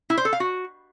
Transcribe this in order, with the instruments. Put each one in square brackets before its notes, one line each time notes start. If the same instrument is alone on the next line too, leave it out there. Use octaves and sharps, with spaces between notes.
[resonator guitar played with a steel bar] E4
C5
A4
F5
F#4